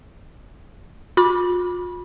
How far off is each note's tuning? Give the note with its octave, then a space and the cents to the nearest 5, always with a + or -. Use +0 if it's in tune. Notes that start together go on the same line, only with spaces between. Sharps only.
F4 +40 B5 -20 D6 +0